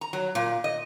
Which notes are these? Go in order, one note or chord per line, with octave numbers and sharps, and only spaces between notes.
A#5
F#3
A#2
D#5